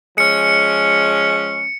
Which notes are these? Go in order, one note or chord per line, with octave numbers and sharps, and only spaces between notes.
F3 G#3 C#4 C#7